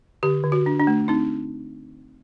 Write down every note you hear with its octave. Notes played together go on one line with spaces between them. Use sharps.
D3 G4
D3
F#4
D4
D4
A3
C4 D#4